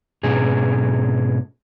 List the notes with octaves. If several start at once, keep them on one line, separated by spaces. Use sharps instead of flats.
G#2 B2 C#4 G#4